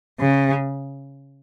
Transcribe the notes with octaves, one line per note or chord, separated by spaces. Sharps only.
C#3